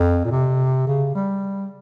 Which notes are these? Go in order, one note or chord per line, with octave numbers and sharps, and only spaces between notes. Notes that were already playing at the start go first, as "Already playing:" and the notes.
Already playing: F2
A#2
C3
C#3
G3